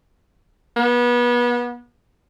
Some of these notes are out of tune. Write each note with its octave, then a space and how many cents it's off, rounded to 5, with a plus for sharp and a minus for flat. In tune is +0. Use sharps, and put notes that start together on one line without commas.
B3 -30